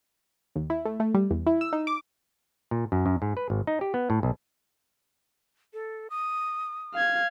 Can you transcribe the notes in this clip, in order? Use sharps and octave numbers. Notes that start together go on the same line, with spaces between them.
D#2
E4
A3
A3
G3
E2
E4
E6
D#4
D6
A#2
F#2
F#2
G#2
B4
G#1
D#4
G4
B3
A2
B1
A4
D#6
F5 G#6